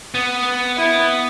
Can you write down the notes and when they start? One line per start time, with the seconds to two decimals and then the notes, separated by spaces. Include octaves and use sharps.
0.15 B3
0.78 E4